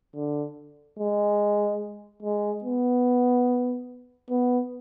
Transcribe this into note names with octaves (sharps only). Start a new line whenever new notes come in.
D3
G#3
G#3
B3
B3